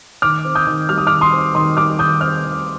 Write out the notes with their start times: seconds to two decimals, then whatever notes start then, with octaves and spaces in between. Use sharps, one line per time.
0.22 D#3 D6 F6
0.45 C4
0.55 D#6 G6
0.67 D#3
0.89 G3 F6
0.98 D#6
1.07 D#3 D6 F6
1.21 C6 D#6
1.33 C4
1.55 D#3 C6 D#6
1.77 G3 D6 F6
1.99 D#3 D#6 G6
2.21 C4 D6 F6
2.44 D#3